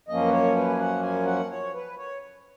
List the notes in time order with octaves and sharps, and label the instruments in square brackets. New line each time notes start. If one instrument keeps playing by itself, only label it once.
[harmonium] F#2 F3 A#3 C#4 D#5
B4
C#5
B4
G#5
F#5
G#5
F#5
C#5
B4
C#5